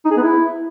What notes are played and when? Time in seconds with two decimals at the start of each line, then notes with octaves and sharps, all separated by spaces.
0.05 D#4
0.11 G#4
0.17 B3
0.22 E4